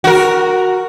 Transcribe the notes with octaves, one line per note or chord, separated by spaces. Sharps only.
F#4 A#4